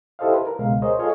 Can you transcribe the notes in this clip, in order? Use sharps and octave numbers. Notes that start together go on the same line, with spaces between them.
E4 G4 A4 C5 D#5 F5
B4
A#4
C#2 B2 G#3 F5
G#4 A#4 C5 C#5 D#5
F4 G#4 A4 C#5 D#5 F5